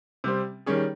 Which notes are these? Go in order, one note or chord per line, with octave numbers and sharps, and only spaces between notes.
C3 G3 C4
D#3 G3 C#4 G#4